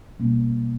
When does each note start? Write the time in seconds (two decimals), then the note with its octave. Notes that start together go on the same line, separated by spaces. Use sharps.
0.20 B2 G3 A#3 C#4